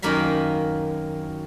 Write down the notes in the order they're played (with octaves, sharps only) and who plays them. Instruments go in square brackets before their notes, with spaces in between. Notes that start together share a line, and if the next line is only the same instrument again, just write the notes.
[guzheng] F#2 D#3 A#3 F5 B5 C6